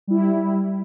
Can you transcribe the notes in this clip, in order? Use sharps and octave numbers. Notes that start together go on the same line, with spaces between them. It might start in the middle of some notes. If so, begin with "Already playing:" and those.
G3 E4